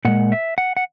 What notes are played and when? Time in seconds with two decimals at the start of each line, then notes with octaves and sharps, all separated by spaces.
0.05 A#2 G#3 F#5
0.32 E5
0.58 F#5
0.77 F#5